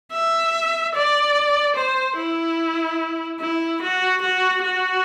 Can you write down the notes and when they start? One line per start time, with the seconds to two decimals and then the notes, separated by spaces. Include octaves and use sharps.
0.12 E5
0.94 D5
1.76 C5
2.17 E4
3.39 E4
3.81 F#4
4.21 F#4
4.62 F#4